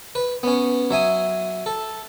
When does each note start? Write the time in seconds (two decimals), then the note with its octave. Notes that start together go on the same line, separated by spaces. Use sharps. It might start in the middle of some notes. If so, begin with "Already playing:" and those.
0.15 B4
0.43 B3 C#4
0.90 F#3 E5 G#5 D#6
1.66 A4